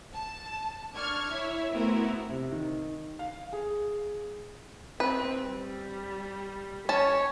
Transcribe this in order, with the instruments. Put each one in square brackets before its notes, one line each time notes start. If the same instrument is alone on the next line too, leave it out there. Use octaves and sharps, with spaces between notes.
[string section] A5
D4 C#6 F6 G#6
E4 C#5 E5
A3 B3 C4 E4 F#4 A#4
[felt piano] C3
D#3
F5
G#4
[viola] C4 [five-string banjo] B4
[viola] G3
[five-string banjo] C#4 A5 [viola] C#5